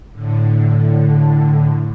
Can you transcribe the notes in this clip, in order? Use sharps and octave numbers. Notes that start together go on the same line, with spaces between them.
A2 D3